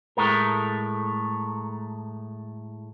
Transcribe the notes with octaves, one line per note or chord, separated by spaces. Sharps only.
A2 G#3 A3 A#4